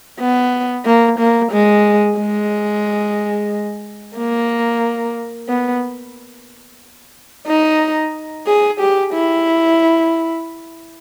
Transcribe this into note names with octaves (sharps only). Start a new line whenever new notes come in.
B3
A#3
A#3
G#3
G#3
A#3
B3
D#4
G#4
G4
E4